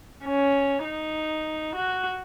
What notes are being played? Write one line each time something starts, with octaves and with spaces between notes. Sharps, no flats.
C#4
D#4
F#4